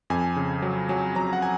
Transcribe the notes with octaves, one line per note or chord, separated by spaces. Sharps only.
F2 G#5
C#3
F#3
F#3 G#5
F#3 A#5
F#5
G#5